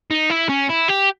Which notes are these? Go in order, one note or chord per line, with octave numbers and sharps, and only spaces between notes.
D#4
E4
C#4
E4
G4